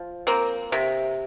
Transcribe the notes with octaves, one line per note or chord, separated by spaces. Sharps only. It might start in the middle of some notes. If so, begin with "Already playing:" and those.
Already playing: F3
A#3 C4
C3